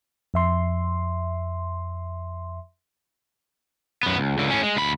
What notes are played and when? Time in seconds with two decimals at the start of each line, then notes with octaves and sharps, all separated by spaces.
0.34 F2 E5 C6
4.03 F#2 B3
4.18 C#2
4.38 C#2 D3
4.50 A2 C#4
4.63 G#3
4.77 D2 B5